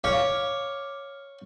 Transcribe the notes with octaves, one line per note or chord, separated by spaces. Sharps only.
C#5 F5 D6 F6